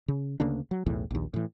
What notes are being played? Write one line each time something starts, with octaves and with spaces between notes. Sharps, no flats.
C#3
D2 C#3 A#3 D4
F#3
B1 E2 A2 E3
A#1 D#2
A2 E3